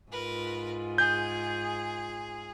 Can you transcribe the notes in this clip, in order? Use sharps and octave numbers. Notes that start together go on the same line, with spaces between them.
G#2 F4 A#4 B4
G#4 G6